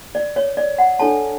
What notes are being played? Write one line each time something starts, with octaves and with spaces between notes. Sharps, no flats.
D5
C#5
D5
F#5
D4 A4 C#5 A5